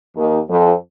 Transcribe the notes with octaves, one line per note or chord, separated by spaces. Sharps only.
D#2 D#3
F2 F3